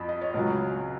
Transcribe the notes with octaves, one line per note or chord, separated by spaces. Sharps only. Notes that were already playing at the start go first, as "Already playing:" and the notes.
Already playing: F2 F3 B5
D#5
C#5
C#2 C#3 F#3